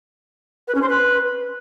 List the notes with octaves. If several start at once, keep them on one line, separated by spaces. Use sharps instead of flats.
B4
C#4
C5
B4